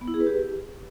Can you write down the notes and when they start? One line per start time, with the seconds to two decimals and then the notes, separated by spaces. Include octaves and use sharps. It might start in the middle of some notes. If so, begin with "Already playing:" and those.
0.01 B3
0.08 E4
0.14 G#4
0.20 B4
0.27 G4